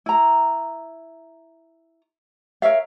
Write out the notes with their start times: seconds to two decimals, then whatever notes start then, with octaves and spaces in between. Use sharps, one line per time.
0.06 E4 A#5
2.62 A#4 C#5 E5 F5